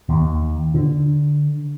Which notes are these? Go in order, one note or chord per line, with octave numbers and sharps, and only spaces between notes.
D#2
D3